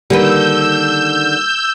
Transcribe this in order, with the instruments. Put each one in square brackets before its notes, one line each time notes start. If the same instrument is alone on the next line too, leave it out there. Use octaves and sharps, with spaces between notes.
[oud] D3 D#3 B4 [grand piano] G3 A#3 [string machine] E6 G6